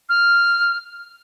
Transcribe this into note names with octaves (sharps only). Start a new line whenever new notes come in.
F6